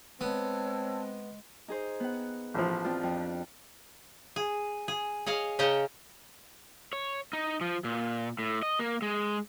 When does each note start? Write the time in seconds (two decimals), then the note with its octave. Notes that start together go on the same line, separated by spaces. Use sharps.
0.21 G#3 B3 C4 C#5 A5 E6
1.68 D#4 G#4 C5
2.00 B3 F#5
2.54 A1 F3
2.85 C4 D4 F4
3.03 F2
4.36 G#4
4.88 G#4
5.26 G#4 C#5 D#5 F5
5.59 C#3 C#4 D#5 G5 A5 A#5
6.93 C#5
7.33 D#4
7.61 F3
7.84 A#2
8.39 A2
8.63 D#5
8.79 A#3
9.02 G#3